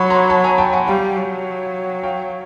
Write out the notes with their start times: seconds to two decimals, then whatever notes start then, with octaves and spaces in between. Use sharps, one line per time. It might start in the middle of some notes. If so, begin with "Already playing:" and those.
Already playing: F#3 B5 C#6
0.10 A#5 C6
0.30 A5 B5
0.44 G#5 A#5
0.58 G5 A5
0.73 F#5 G#5
0.87 G3 F5 G5
1.17 F#3
2.03 F5 G5